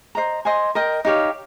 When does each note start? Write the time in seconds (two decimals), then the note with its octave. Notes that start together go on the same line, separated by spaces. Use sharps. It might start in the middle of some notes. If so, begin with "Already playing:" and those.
0.15 C5 D#5 A#5
0.45 C5 D#5 G#5 C6
0.75 A#4 D#5 G5
1.05 D#4 G4 C#5 F5